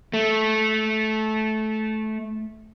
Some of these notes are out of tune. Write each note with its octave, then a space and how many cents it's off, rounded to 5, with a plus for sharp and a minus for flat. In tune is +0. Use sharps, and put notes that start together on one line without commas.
A3 -15